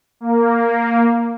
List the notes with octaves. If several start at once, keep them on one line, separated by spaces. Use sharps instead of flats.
A#3